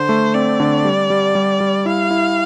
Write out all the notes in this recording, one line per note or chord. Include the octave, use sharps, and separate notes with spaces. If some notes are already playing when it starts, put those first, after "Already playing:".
Already playing: D3 C5
A3
C4 D5
D3
G3
G3
G3
G3
E4 F5
E4